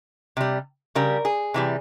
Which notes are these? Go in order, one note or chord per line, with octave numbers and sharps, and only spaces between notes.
C3 G3
C#3 G3 A#4
G#4
C3 E3 G3